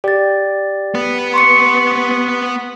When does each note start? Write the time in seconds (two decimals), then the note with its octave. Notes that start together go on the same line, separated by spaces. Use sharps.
0.04 G4 D5 A6
0.95 B3 B4
1.34 C6 C#6 C#7